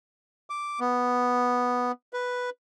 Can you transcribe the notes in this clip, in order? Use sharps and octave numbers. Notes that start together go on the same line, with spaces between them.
D6
B3
B4